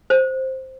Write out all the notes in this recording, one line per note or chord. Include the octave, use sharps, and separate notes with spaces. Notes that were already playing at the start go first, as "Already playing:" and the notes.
C5